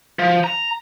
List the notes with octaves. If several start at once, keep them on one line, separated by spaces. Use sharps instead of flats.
F3
A#5